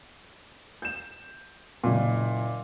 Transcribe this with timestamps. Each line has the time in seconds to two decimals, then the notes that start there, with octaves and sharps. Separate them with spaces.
0.82 G6 E7
1.84 F#1 A#2